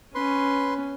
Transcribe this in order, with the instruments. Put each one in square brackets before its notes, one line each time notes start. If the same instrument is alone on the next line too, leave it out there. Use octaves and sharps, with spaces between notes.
[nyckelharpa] C#4 [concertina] B4 C6